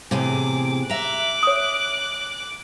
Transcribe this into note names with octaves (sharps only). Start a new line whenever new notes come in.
E2 A2 C3 G#4 D6
E5 A#5 D6 F#6
C#5 D#6